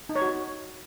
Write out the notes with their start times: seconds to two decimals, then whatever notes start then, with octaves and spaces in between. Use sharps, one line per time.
0.09 D#4
0.16 C#5
0.22 F#4